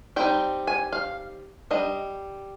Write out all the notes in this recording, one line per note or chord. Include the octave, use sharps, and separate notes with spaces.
G3 C4 D#4 G5
G#5
F5
G3 D4 D#5